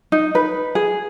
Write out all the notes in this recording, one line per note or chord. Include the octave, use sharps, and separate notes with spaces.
D#4
B4
G#4